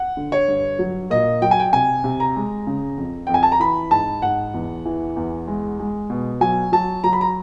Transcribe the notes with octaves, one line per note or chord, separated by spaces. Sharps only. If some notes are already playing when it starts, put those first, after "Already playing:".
Already playing: F#5
D3
C#5
G2
F#3
A#2 D#5
F#3 G5
G#5
G5
C3 G#5
C3
A#5
G#3
C#3
F2
F2 G5
G#5
A5
A#5
E3 B5
G#2 A5
G#2 F#5
E2
E3
E2
G#3
G#3
B2
F#3 G#5
F#3 A5
F#3 A#5
B5
A#5